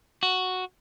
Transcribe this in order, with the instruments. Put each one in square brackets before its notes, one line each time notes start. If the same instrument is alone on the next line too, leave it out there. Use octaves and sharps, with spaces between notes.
[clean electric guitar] F#4